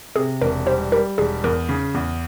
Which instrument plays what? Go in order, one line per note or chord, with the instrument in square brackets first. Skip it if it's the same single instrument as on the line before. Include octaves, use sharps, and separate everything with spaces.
[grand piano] C3 [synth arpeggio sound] G#4
[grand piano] E1 [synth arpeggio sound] A#4
[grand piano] G3 [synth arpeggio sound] C5
[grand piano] G3 [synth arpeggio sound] A#4
[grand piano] E1 [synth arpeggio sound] G#4
[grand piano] E2 [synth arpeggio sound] A#4
[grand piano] C#3
E2